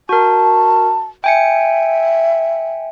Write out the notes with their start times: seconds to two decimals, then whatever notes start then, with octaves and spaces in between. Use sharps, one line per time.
0.09 F#4 A#4 A5
1.24 E5 G5 G#5 C#7